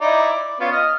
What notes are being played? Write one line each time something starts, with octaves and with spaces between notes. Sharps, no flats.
D#4 E4 D5
D5
B3 C#4 F4
D#5 F6